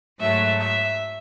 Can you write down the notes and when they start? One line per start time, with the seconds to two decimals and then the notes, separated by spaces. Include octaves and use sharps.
0.20 G#2 F#3 A3 E5
0.60 E5